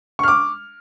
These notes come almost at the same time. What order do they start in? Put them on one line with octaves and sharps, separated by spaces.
C#6 F6 D6